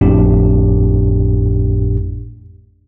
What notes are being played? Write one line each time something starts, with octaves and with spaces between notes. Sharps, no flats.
G#1 F2 A2 D4 G4